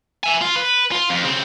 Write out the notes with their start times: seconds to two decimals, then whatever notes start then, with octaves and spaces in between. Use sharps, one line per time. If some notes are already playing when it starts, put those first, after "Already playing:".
0.24 E5 G#5
0.41 F4
0.56 B4
0.92 F4
1.10 F2
1.23 C#3 C4